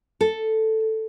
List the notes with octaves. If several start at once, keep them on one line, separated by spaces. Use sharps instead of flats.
A4